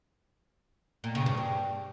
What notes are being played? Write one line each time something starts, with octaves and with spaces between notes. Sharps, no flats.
A#2
C#3
G2
G2